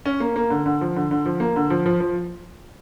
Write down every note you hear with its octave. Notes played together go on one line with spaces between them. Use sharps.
C#4
A#3
A#3
D3
D3
F3
D3
D3
F3
A#3
D3
F3
F3
F3